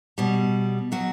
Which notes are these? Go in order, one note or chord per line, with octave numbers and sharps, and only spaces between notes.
B2 G3
B2 F#3 F#4